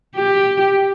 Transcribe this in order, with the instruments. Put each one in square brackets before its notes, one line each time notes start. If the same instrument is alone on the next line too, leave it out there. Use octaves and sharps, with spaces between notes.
[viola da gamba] G4